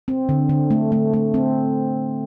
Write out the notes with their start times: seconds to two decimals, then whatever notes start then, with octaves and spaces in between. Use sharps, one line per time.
0.08 C4
0.29 D3
0.49 D3
0.71 A3
0.92 A3
1.13 A3
1.34 C4